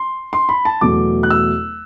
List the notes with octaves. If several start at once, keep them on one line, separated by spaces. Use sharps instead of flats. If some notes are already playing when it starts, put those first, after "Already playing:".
Already playing: C6
C6
B5
A5
E2 B2 F#3 A3 D6
F#6
E6